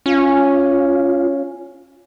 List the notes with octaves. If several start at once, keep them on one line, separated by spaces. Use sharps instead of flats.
C#4 F4